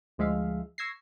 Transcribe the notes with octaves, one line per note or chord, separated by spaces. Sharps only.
D2 F3 G#3 E5 F5
C#6 E6 G#6 A#6 C7